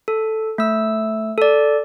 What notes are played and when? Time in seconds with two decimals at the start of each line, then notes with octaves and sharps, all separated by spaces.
0.08 A4
0.58 A3 E6
1.38 A4 D5